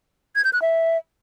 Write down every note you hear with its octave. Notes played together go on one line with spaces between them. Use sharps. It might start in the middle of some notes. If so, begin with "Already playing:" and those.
G#6
G6
F#6
E5